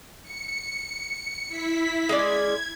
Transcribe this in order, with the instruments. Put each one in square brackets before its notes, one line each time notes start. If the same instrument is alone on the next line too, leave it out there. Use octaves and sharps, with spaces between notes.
[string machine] C#7
E4 B6
[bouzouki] G#3 C#4 D5 [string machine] G#6